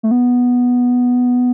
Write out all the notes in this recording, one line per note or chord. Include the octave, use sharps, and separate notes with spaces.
A3
B3